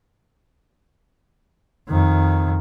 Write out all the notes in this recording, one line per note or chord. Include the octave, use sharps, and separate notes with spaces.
F2 D#3